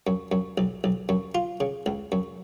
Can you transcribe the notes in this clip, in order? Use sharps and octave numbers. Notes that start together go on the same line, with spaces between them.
F#2
F#2
B1
B1
F#2
F4
C#3
C#2
F#2